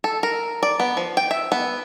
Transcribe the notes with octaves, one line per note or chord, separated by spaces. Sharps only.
A4
A#4
D5
B3
F3
G5
E5
B3